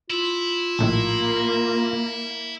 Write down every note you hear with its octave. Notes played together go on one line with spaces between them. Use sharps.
E4 F4
A#1 A2 D#3 A#3